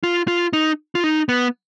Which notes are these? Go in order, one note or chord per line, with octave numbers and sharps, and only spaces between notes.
F4
F4
D#4
F4
D#4
B3